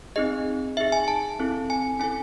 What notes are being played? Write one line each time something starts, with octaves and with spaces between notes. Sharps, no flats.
C4 D#4 G#4 D#5
D#4 G#4 E5
G#5
A5
C4 E4 A4
G#5
C#4 E4 A4 G#5